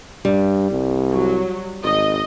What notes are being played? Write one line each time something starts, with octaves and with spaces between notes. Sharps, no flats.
G2 G3
C2
F#3
G#1 D#5